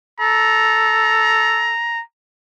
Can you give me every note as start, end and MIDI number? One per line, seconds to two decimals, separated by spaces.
0.20 1.72 69
0.20 2.01 82